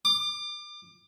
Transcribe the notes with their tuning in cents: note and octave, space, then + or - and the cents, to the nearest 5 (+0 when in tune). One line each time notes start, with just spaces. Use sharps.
D6 +30